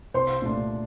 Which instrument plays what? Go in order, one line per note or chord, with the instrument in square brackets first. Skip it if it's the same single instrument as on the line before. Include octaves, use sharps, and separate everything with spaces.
[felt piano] C2 [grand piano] C5 C6
[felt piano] A#2 A3 D4